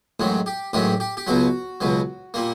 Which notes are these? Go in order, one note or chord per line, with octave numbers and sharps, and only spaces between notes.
A1 G#2 D#3 F#3
G4
A1 G#2 D#3 F#3 G4
G4
G4
C#2 B2 F#3 F#4
C#2 B2 F#3
A#2 G3 A#3